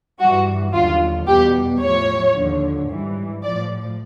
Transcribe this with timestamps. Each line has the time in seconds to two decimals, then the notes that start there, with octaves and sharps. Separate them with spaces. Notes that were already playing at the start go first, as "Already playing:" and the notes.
0.20 G2 E3 G3 F#4
0.74 D#2 D3 F#3 F4
1.27 E2 B2 G3 G4
1.81 A2 F3 C#5
2.35 D#2 D3 F3
2.89 G#2 E3 G3
3.43 A2 F3 D5